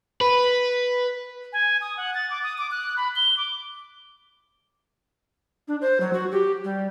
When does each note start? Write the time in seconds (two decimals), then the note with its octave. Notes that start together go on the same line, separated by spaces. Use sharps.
0.21 B4
1.53 G#5
1.81 D#6
1.97 F#5
2.14 A6
2.30 D6
2.43 D#6
2.58 D6
2.71 F#6
2.97 B5
3.16 G7
3.37 D6
5.68 D4
5.81 C5
6.01 F#3
6.13 F#4
6.32 G4
6.64 G3